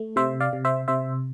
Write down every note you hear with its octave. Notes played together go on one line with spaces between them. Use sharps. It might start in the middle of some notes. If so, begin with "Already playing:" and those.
Already playing: A3
C3 C5 E5
D5 F5
C3
C5 E5
C3 C5 E5